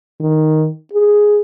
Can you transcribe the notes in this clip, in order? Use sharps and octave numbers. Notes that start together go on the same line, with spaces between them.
D#3
G#4